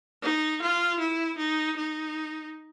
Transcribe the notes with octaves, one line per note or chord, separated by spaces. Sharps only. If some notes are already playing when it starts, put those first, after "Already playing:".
D#4
F4
E4
D#4
D#4